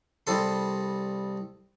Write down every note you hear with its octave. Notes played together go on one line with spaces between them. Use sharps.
C2 G3 A4 C6